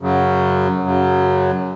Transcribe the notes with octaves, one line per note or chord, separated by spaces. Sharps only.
F#2 C#3 F#3
F#2 C#3 F#3